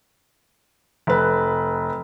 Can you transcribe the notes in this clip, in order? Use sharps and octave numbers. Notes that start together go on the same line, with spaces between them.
F1 B4